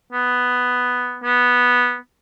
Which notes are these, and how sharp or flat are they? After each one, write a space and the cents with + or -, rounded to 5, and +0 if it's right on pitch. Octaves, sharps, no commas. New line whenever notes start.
B3 +5
B3 -5